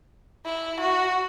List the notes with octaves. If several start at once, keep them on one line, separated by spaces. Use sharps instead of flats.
E4
F#4